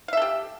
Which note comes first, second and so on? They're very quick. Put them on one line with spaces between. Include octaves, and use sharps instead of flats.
F5 E5 A4 G4